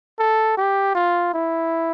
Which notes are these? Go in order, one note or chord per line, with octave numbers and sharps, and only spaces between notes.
A4
G4
F4
E4